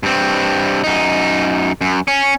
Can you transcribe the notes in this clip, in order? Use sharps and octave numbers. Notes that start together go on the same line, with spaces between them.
G2 C4
F#2 D#4
F#2
C#4